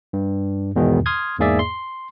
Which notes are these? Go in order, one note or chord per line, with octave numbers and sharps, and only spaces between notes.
G2
E2 G#2 B2 D#3
C6 D#6 F6 G#6
E2 G#2 A#3 G#4 D5 E5
C6